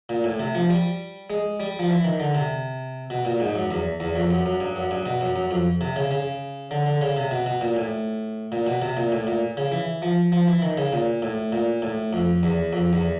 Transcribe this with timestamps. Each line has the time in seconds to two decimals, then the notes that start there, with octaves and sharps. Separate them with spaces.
0.09 A#2
0.24 A2
0.40 C3
0.55 F3
0.70 G3
1.30 G#3
1.60 G3
1.79 F3
1.90 E3
2.05 D#3
2.20 D3
2.35 C3
3.10 B2
3.25 A#2
3.40 G#2
3.56 F#2
3.71 E2
4.00 E2
4.16 F2
4.30 F#2
4.46 F#2
4.60 G2
4.76 F#2
4.91 G2
5.06 B2
5.21 F#2
5.36 F#2
5.51 F2
5.81 C3
5.96 C#3
6.11 C#3
6.71 D3
6.86 D3
7.01 C#3
7.17 C3
7.31 B2
7.46 B2
7.61 A#2
7.77 A2
8.52 A#2
8.67 B2
8.82 C3
8.97 A#2
9.12 A2
9.27 A#2
9.57 C#3
9.72 E3
10.02 F3
10.32 F3
10.47 E3
10.62 D#3
10.77 C#3
10.92 A#2
11.22 A2
11.52 A#2
11.82 A2
12.13 F2
12.43 E2
12.73 F2
12.93 E2